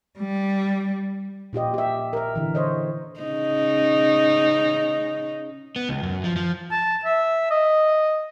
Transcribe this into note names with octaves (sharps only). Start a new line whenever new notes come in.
G3
A#2 F4 G4 D#5
G4 E5
A#4 E5
D3 E3
C5 C#5 D#5
C#3 D#4
B3
C#2
F#2
F3
F3
A5
E5
D#5